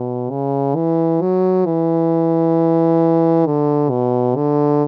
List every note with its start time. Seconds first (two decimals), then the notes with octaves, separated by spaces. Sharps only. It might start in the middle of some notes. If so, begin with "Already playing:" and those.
Already playing: B2
0.31 C#3
0.76 E3
1.21 F#3
1.66 E3
3.46 D3
3.90 B2
4.36 D3